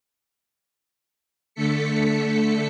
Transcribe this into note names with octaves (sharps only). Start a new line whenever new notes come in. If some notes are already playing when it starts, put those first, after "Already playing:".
D3 A3 A4 B6 C#7